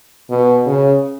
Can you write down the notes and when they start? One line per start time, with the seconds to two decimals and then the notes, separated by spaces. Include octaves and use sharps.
0.30 B2
0.66 C#3